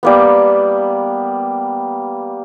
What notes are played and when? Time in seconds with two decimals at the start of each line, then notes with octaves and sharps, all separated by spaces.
0.03 G3 A#3 B3